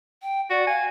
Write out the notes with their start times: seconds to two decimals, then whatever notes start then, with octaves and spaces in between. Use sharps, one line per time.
0.22 G5
0.50 F#4 D5
0.67 F5 G#5